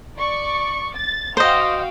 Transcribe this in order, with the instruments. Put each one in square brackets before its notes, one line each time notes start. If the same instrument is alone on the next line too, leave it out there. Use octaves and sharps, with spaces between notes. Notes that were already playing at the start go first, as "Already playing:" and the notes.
[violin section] D5 C#6
A6
[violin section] F#4 F5 G5 [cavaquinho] C5 D#5